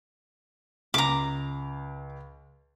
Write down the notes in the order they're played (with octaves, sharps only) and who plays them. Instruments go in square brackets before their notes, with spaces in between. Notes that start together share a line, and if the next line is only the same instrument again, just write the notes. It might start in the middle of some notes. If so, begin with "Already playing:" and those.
[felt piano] C#2 [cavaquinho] A#5 D6